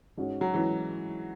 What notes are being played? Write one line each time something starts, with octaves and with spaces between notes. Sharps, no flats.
G#2 G#3 C#4 F#4 C#5
F#3
E3 G#3 C#4 F#4